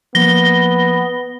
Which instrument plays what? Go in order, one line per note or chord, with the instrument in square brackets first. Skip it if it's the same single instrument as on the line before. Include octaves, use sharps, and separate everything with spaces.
[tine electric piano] F3 A#3 [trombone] B3 [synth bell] A#6 G7